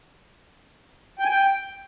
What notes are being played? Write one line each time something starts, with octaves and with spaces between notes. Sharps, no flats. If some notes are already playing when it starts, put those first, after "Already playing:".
G5
G#5
G5